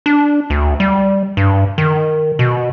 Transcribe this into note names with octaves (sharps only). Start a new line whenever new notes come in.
D4
D2
G3
G2
D#3
B2